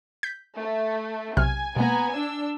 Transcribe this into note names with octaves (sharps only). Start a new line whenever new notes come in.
G6 B6
A3
B1 C3 G#5 F6
B2 G#3 A#3 B3 G#5 A#5
D4 E6